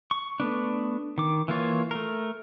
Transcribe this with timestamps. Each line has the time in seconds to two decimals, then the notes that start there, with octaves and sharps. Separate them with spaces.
0.11 C#6
0.40 A3 B3 D4
1.18 D#3 D6
1.48 E3 A#3 F4 C#5
1.91 A3 A#4